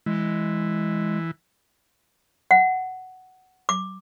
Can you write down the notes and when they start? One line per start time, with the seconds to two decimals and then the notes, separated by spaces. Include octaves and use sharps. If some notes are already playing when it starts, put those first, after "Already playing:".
0.06 E3 G#3
2.51 F#5
3.69 D6